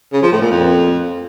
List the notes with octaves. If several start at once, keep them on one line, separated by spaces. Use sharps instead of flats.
C#3
F3
A2
A#2
F2